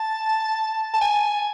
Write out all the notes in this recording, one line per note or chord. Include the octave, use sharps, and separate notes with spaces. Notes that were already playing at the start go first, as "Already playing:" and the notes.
Already playing: A5
A5
G#5